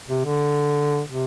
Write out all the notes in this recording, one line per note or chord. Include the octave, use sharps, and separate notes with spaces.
C3
D3
C3